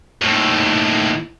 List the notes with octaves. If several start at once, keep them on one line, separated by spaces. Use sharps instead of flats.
D#2 A2